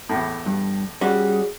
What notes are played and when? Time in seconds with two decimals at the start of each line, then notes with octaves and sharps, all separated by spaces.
0.09 E2 A2
0.46 G2
1.01 G3 C#4 F#4 G#4